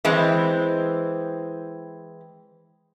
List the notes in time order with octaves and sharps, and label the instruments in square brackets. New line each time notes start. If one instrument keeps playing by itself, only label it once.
[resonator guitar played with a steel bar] E3 G#3 C4